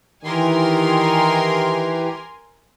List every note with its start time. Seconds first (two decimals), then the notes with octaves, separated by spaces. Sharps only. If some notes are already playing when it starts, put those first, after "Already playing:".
0.25 D#3 E3 G4 A#4 G#5 C6